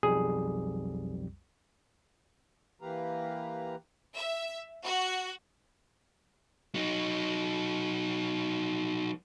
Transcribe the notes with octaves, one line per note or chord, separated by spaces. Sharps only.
B1 F2 G3 G#4
E3 A#3 G4 B4 F5 A#5
E5
F#4
F#3 D#4